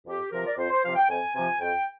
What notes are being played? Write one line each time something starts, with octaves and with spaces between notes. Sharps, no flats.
F2 G4
C3 F3 A#4
D5
F2 C5
C5
C3 F3 F5
G5
F2 G#5
C3 F3 G#5
F2 G5